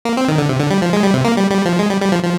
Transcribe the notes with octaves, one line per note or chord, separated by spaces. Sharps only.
A#3
C4
D#3
D3
C3
D3
G3
F3
G#3
G3
C3
A#3
G3
G3
F3
G#3
G3
G3
F3
F3